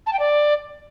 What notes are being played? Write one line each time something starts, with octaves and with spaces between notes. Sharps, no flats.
A5
G5
D5